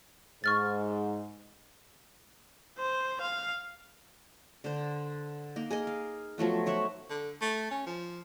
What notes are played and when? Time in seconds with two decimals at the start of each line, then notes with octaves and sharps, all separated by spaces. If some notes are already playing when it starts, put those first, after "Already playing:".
0.44 G#2 C#6 F6 A6
2.79 C5
3.21 F5
4.64 D3 C5
5.56 A#3 D#4
5.71 G#4 A#4 D#5
5.87 F5
6.38 F3 F#3 A3 B3
6.66 D#4 C#5 E5 F#5
7.10 D3
7.42 A3
7.71 C#4
7.86 F3